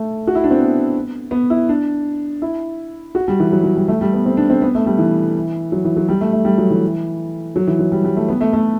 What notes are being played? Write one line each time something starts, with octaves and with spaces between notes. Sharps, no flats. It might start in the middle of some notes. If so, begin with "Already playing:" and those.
Already playing: A3
F#4
E4
D4
C4
B3
B3
E4
D4
E4
F#4
G3
E3
F#3
F#3
G3
A3
G3
B3
C4
D4
C4
B3
A3
G3
E3
F#3
E3
F#3
G3
A3
A3
G3
F#3
E3
F#3
E3
F#3
G3
G3
A3
B3
A3
A3